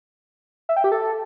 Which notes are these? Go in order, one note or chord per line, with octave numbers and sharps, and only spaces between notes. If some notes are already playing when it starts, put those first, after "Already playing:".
E5
G5
G4
A4